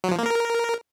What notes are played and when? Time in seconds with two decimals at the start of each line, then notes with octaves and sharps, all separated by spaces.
0.04 F#3
0.11 F3
0.18 A#3
0.26 A#4